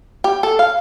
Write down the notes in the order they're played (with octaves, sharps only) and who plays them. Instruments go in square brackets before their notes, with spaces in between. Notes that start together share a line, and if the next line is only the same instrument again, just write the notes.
[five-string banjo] G4
A4
F5